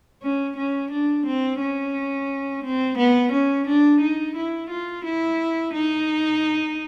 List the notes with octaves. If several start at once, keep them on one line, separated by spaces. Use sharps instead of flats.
C#4
C#4
D4
C4
C#4
C4
B3
C#4
D4
D#4
E4
F4
E4
D#4